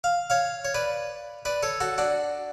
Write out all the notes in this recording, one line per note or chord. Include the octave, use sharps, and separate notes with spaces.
F5
C#5 F5
C#5
B4 D5
B4 D5
A4 C#5
F#4 A4
D4 F#4